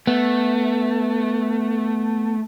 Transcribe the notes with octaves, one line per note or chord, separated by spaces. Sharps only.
A3 B3